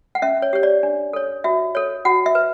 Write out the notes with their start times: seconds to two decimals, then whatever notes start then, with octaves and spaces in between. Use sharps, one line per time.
0.15 F#5
0.22 C#4 E5
0.42 C#5
0.53 G4 C#5
0.63 D5
0.83 D4
1.13 A4 C#5
1.44 F#4 E5
1.75 A4 C#5
2.05 F#4 F#5
2.26 E5
2.35 B4